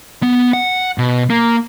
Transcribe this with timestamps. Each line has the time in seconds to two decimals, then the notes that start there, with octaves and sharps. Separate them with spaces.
0.23 B3
0.53 F#5
0.98 B2
1.30 A#3